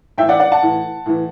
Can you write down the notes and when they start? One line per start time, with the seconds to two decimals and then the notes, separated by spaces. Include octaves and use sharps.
0.18 A2 E3 E5 G5
0.29 D5 F#5
0.40 D5 F#5
0.52 F#5 A5
0.62 A2 E3
1.06 A2 E3